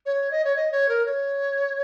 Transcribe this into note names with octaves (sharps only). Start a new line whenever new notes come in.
C#5
D#5
C#5
D#5
C#5
A#4
C#5